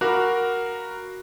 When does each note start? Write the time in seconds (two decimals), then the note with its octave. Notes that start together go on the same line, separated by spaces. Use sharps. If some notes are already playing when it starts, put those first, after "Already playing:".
0.01 F#4 A#4 F5 B5 D6 F#6